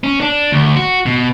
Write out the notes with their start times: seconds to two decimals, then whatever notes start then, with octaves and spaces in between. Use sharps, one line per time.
0.04 C#4
0.20 D4
0.52 D2
0.76 F#4
1.06 B2